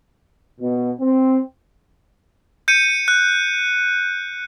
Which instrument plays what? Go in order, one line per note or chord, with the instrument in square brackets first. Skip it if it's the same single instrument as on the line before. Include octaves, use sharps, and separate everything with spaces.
[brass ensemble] B2
C4
[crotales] G6 C#7 D#7
F#6